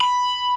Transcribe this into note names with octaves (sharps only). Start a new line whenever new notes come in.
B5